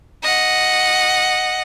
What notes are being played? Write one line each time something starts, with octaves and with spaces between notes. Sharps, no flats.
D#5 F#5